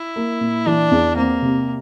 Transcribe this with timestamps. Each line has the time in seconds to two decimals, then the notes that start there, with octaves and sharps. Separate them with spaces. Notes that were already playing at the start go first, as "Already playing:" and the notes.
Already playing: E4
0.16 A#3
0.41 A#2
0.66 E3 D4
0.91 E2
1.16 A#3 C4
1.42 C3